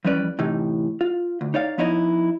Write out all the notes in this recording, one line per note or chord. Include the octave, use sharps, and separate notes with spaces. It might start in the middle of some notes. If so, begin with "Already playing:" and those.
F2 E3 G3 C#4 B4 D5
A2 C3 E3 D#4
F4
D2
D#4 C#5 D5 F5
F3 B3 D#4 E4 C#5 D#5